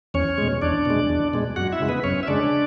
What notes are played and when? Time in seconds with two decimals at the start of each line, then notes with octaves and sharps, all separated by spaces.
0.14 E2 C#4 C#5
0.38 B2 G#3
0.62 E2 D4 D5
0.85 B2 G#3
1.09 E2
1.34 B2 G#3
1.56 F#2 F#4 F#5
1.73 E4 E5
1.80 C#3 G#3
1.89 B3 B4
2.04 F#2 C#4 C#5
2.23 E5
2.27 C#3 G#3 D4 D5